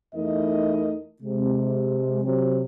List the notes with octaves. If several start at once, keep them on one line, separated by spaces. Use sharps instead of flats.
E2 A3 D#4 E4 A#4 D#5
C3 G#3
C3 F#3 C4